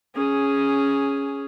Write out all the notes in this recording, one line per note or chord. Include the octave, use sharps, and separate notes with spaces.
C#4 G#4